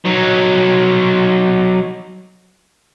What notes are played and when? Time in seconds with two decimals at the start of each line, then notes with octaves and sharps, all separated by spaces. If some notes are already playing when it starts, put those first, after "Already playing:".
0.05 F#3 D#4